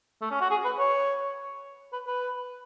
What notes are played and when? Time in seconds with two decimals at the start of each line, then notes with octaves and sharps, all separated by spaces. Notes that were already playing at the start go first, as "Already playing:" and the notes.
0.22 A3
0.31 C#4
0.41 F#4
0.51 G#4
0.65 B4
0.79 C#5
1.93 B4
2.07 B4